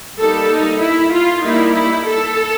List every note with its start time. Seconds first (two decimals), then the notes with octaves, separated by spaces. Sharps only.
0.18 G3 A#3 D#4 A4
0.50 D#4
0.81 E4
1.12 F4
1.42 G3 A#3 D#4 E4
1.74 E4
2.06 A4